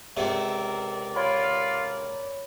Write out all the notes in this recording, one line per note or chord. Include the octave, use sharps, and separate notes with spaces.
C#2 C3 A#4 D5
F4 C#5 B5